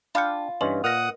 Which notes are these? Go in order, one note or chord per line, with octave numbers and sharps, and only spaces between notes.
D4 F4 F5 G5 B5 C#7
G2 E3 C#4 B4 D#5 C6
A#2 A#4 F#5 D#6 F6 A#6